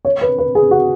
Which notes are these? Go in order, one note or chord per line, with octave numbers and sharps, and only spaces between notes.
C#5
B4
B4
G#4
F#4